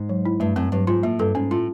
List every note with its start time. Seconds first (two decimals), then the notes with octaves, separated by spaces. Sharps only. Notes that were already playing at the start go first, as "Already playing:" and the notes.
Already playing: G#2
0.09 F#3
0.25 E4
0.40 G2 A3
0.56 F#2 C4
0.72 G2 F#3
0.87 G#2 F4
1.03 A2 A#3
1.19 G2 A4
1.35 G#2 C#4
1.51 A2 F4